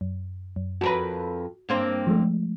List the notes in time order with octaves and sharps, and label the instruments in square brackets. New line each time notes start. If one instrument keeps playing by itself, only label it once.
[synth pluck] F#2
F#2
[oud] F2 A#4 B4 [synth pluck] F#4
[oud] G2 A#3 C4
[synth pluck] F3 G#3 A3